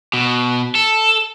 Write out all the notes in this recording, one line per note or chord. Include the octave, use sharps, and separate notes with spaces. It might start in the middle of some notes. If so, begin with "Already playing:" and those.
B2
A4